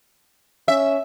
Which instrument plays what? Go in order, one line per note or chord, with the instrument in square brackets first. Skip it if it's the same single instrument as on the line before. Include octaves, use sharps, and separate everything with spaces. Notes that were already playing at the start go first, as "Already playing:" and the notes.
[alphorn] C#4 [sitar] E5